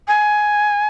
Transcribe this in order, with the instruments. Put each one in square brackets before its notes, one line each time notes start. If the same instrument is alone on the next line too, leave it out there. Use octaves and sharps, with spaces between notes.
[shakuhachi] G#5